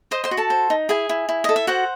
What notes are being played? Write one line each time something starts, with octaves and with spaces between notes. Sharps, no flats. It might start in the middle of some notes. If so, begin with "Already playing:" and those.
C5 D#5 C6
C5 C6
F#4
A4 A5
C5
D#4
E4 G#4 G#5
E4
E4
A4 D#5
E5
F#4 C5 F#5